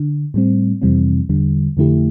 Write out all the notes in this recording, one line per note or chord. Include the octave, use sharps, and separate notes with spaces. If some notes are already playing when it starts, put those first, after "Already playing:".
Already playing: D3
A2 G3 C4
F2 C3 E3 G3 C4
E2 D3 G3
F2 D3 A3 E4 G4